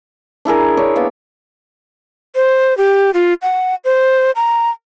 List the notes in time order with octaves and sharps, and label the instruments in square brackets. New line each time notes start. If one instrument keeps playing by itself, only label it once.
[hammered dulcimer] D4 E4 G#4 A#4
D4 C#5
A#3 B3 E5
[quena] C5
G4
F4
F#5
C5
A#5